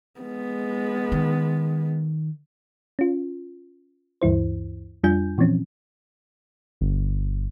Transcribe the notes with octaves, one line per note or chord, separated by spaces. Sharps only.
G#3 B3
D#3
C#4 F4
D2 G2 E3 E4 C5
F2 G3 D4 F4 G#5 G6
A#2 E3 F3 C4 C#4
G1